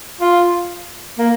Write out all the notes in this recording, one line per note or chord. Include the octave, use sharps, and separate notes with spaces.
F4
A#3